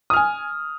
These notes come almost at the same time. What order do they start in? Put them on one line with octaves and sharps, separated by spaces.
D#6 F6 G#5